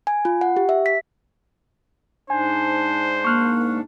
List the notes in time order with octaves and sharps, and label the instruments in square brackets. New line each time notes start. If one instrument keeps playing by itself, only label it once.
[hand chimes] G#5
F4
F#5
G4
E5
B6
[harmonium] G#2 D4 [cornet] C5 [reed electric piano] G#5
[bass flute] A#3 [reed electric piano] C#6 F6 F#6